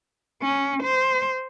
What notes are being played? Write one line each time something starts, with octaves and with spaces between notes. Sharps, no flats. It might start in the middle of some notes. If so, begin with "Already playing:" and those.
C#4
C5